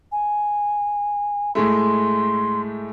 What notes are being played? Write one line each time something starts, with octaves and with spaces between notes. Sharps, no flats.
G#5
A2 G#3 A3 C6